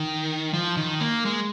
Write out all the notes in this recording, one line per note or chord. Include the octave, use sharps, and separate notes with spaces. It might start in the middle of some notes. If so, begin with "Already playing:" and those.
Already playing: D#3
F3
D#3
A#3
G#3